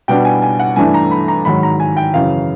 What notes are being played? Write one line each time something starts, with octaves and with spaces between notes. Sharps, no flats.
B2 G3 B3 D4 G5
G#5
G#5
F#5
G2 E3 A3 D4 G#5
A#5
B5
A#5
G#2 D#3 F#3 B5
A#5
G#5
G5
F#2 C#3 E3 F5